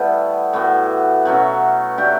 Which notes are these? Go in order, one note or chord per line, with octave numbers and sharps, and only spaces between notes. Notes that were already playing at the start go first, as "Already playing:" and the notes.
Already playing: G3 A3 B3 E4 A4 B4
A2 E3 B3 F#4
B2 F#3 A3 C#4
F#3 A3 D4 G4